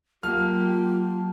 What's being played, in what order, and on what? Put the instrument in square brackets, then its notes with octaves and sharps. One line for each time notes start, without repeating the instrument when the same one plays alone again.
[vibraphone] F#3 A5 [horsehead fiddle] A#3 G4 [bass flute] F4 [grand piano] F6